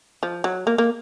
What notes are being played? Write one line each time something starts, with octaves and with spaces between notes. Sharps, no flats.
F3
F#3
A#3
A#3